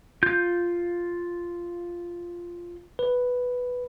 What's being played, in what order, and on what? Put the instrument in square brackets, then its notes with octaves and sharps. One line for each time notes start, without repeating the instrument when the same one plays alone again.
[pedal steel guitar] F4 G6
[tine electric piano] B4